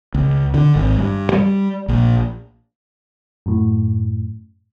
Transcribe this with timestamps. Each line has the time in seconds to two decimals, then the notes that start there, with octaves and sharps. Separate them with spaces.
0.14 C#2
0.54 D3
0.76 G#1
0.98 G2
1.32 G3
1.88 A#1
3.46 F#2 A2